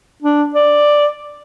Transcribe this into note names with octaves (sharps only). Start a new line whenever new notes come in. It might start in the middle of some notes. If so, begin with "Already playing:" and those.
D4
D5